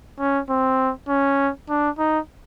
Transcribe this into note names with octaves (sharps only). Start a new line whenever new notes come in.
C#4
C4
C#4
D4
D#4